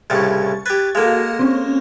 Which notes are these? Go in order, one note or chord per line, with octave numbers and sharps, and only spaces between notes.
C2 A2 C#3 C#6 A6
G4 B4 G#6 A6
G#3 A#3 F#4 A4 F5
C4 C#4